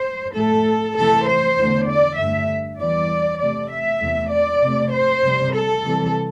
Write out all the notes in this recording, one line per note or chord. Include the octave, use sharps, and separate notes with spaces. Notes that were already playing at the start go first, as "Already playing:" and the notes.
Already playing: C5
A2 A3 A4
C3 E3 A3 A4
C5
E2 D3 A3
D5
G2 D3 A3 E5
E2 E3 G3 D5
C3 A3 D5
E5
E2 C3 A3
D5
C3 A3
C5
C3 G3
A4
C3 E3 G3